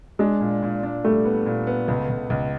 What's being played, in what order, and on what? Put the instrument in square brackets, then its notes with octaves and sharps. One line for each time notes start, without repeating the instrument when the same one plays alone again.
[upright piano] G#3 [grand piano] D4
[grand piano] A#2
A#2
D4
[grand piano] G3 [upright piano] A3
[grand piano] B3
A#2
B3
C#2
C#2
C#2